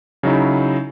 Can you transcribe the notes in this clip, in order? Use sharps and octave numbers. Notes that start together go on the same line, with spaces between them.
C#3 F#3 D#4 E4